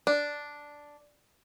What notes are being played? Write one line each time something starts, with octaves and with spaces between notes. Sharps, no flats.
D4